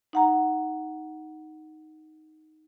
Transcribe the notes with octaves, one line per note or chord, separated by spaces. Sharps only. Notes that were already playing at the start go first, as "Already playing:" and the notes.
D#4 F#5 A#5